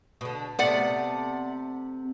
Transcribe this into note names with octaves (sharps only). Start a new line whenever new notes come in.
B2 D3
C3 A3 B3 D5 F#5